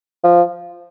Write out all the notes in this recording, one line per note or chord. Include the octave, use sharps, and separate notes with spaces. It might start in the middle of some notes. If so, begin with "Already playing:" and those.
F3